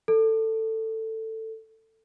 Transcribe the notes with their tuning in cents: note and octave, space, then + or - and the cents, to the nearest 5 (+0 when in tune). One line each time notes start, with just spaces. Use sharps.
A4 +15